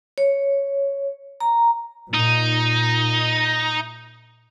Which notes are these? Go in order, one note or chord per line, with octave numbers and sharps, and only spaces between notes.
C#5
A#5
A#2 D#4